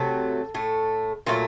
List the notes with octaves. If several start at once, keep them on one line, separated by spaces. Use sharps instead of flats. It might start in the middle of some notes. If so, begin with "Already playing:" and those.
Already playing: C3 F#3 A3 A4
A2 A3
A#2 F#3 A3 F4